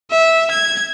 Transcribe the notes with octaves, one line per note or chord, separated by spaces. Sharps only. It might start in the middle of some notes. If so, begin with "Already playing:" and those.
E5
G#6